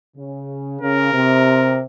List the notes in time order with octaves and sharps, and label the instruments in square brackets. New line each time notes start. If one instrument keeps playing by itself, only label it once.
[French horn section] C#3
[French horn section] C#3 [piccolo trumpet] A#4
[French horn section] C3